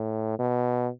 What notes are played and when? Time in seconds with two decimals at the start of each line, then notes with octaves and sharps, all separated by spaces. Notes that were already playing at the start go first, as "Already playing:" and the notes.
Already playing: A2
0.39 B2